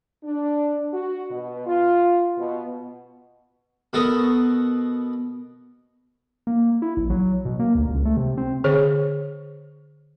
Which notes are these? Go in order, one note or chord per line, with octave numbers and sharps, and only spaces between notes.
D4
F#4
B2
F4
B2
B2 B3 A4 A#4 C#6 D#6
A#3
E4
A#1
F#3
B2
A#3
D2
C#2
A3
C3
C4
D3 G#4 C#5